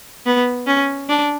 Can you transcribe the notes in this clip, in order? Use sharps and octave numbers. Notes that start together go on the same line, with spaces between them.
B3
C#4
D4